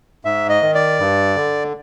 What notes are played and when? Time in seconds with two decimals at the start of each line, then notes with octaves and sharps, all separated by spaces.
0.25 G#2 E5
0.49 D#5
0.62 D#3
0.75 D5
0.99 G2
1.36 D3